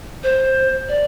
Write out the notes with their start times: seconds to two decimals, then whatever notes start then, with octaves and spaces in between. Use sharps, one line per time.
0.23 C5
0.88 D5